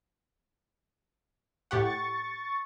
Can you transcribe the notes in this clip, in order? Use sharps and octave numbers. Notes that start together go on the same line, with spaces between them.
A2 G4 F#5 C#6 A6